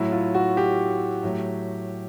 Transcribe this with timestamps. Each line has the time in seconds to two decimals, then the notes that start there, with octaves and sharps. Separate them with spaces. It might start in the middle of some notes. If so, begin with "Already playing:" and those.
Already playing: A2 F#3 E4
0.12 F4
0.35 F#4
0.57 G4
1.23 A2 F#3